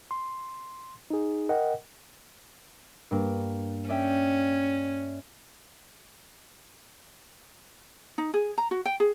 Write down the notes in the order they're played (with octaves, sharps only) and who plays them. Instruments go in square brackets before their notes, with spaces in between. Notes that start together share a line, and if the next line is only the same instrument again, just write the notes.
[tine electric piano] C6
D#4 G#4
A#4 D#5 F#5 G5
[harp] G2 A#3
[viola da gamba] C#4 [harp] D5 E5 G5
[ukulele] D#4
G#4
A#5
F#4
G5
G#4